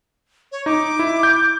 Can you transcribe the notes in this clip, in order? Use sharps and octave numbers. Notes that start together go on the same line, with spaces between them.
C#5
D#4 D6
E4
G6